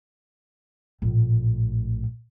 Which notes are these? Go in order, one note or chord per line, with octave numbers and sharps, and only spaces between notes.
A#1 A2